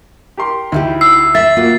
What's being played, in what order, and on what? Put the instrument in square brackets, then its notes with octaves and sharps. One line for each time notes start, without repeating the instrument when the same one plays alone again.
[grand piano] G4 A#4 C6
[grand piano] D2 [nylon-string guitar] D#4 E4 G4
[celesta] E6 [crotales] C7
[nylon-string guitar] E5 [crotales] A6
[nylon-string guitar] A#3 F4 F#4